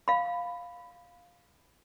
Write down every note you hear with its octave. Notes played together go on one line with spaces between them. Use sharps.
F5 B5